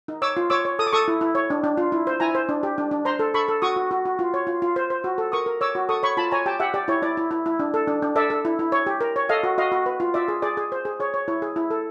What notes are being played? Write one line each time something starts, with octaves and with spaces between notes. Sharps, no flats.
D#4
C#5 D6 E6
F4
C#5 D6 E6
C#5
A4 D#6
D6
A4 C#6 D#6
E4
E4
C#5
D4
D4
F4
E4
C5
E4 G#5 A#5
C5
D4
G4
D4
D4
C5 A#5 C6
A4
A4 B5 C#6
A4
F#4 C#6 D#6
F#4
F#4
F#4
F4
C#5
F4
F4
C5
C5
F#4
A4
A#4 C#6 D#6
A#4
C#5 D6 E6
F#4
A4 C#6 D#6
C#5 B5 C#6
F4 A5 B5
C#5 G#5 A#5
G4 G5 A5
G4 E5 F#5
G4 D5
E4 C#5
E4 D5
E4
E4
E4
D4
A4
D4
D4
A4 D5 E5
A4
E4
E4
C#5
G4
A#4
C#5
A4 D#5 F5
F#4
F#4 D#5 F5
F#4
B4
F4
F4 D5 E5
G#4
G#4 D5
G#4
C5
G#4
G#4 C#5
C#5
E4 C#5
G#4
E4
A4